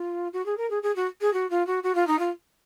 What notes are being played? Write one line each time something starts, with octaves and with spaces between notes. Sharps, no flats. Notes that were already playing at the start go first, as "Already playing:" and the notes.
Already playing: F4
F#4
G#4
A#4
G#4
G#4
F#4
G#4
F#4
F4
F#4
F#4
F4
D#4
F4